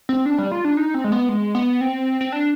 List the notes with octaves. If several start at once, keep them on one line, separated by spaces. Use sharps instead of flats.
C4
D4
G3
F4
D4
D#4
C4
G#3
B3
G#3
B3
C4
C4
D4